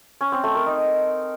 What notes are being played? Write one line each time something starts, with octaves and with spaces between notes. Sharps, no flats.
C#4
C4
A3
A#4
D#4